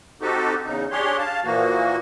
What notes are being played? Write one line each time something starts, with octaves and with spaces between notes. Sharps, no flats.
C4 D#4 F#4 G4 A4
E2 C#3 D#4
D4 G4 G#4 C#5 C6
F5 A5
A#2 E3 F3 A#3 F#4